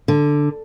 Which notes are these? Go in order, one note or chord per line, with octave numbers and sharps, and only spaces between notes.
D3